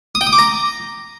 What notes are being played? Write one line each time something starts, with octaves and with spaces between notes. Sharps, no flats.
D#6
G5
D#6
D6
A#5